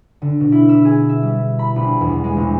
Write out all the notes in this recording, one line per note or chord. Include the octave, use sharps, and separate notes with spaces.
D3
B2
E4
E6
G#4
E5
G3
B5
A#1
E2
G#3
A#1